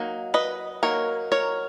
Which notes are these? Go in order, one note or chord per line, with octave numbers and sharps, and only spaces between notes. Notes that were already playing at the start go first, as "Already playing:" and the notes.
Already playing: F#3 A#3 D#4
B4 D#5
F#3 A#3 D#4 A#4 C#5
A#4 C#5